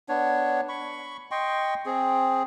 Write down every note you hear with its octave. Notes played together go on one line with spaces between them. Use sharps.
B3 D4 C#5
B5 C#6
D#5 G5 C6 C#6
C4 G#4